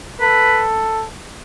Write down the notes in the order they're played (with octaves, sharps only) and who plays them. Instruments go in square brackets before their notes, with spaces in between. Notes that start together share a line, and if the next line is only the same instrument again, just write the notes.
[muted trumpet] A4 [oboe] B4